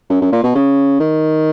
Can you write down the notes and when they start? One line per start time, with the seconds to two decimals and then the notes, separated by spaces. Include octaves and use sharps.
0.10 F#2
0.21 F#2
0.32 A#2
0.43 B2
0.55 C#3
1.00 D#3